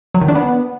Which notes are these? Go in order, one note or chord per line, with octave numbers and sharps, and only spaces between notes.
F#3
D#3
D4
B3